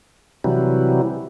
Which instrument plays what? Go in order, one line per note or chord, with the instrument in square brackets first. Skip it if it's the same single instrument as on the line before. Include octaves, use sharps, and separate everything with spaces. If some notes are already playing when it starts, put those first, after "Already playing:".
[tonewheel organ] C3 E3 F#3 G3